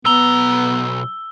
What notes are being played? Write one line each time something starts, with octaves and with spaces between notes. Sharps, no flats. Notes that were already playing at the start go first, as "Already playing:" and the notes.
B1 B3 A#5 E6 G7